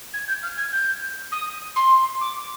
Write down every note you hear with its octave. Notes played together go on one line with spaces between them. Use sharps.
G#6
G6
F6
G#6
G6
D#6
C6
D6